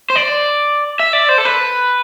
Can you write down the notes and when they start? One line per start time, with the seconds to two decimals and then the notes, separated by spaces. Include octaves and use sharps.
0.10 C5
0.16 D5
1.00 E5
1.13 D5
1.29 C5
1.38 A4
1.45 B4